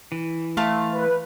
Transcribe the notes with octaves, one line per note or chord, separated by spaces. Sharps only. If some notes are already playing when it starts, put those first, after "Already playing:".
E3
A3 F5 A5 C6
B4